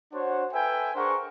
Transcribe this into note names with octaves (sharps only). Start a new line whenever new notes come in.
D4 F#4 C5 C#5 F#5
A4 B4 E5 G5 G#5
D4 G#4 A#4 C5 F#5 C#6